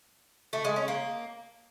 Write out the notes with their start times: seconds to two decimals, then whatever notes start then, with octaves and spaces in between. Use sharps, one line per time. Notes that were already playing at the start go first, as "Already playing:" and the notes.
0.53 A3
0.65 G#3
0.76 C#4
0.88 A#3